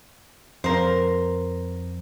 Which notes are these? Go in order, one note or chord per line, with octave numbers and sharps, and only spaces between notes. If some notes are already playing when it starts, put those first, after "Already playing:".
F2 A#4 C5